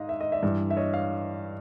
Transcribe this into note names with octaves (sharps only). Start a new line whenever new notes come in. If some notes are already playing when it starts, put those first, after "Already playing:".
Already playing: G#2 D#5 F5
E5
D#5
D5 E5
G2 E3
E5
C#5 D#5
F5